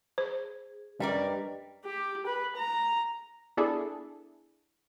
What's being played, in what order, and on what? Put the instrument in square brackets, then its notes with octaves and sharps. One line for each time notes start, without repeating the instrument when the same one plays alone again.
[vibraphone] G#4 [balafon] C5
[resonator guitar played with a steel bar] F#2 A#4 D5 [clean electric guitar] G3 [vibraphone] D4 B4 D#5
[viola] G4
B4
A#5
[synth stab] B3 D4 E4 G#4 A4